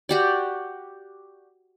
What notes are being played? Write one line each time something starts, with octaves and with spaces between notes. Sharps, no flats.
F#4 G4 D5